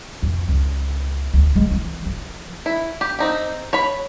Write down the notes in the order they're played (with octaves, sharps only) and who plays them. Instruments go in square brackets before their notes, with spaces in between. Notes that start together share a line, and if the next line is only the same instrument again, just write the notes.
[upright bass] F2
C#2
D2
G#3
E3
F3
[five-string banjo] E4
G4
C4 D#4 G4
C#5 B5